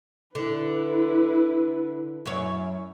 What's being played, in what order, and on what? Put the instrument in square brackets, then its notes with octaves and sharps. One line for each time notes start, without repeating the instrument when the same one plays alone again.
[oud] D3 [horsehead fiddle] E4 B4
[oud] F#2 E4 C#5